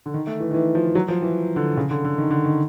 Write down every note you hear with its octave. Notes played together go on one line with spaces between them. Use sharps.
D3
D#3
A3
E3
D#3
E3
F3
F#3
F3
E3
D3
C#3
D3
D3
D#3
D3
D#3